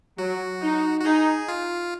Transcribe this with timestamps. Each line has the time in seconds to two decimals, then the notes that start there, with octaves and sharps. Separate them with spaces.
0.18 F#3 F#4
0.61 D#4
1.00 F#4
1.05 D#4 G#4
1.48 F4